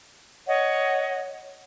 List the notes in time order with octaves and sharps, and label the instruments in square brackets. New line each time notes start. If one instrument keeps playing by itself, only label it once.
[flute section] C#5 D#5 F#5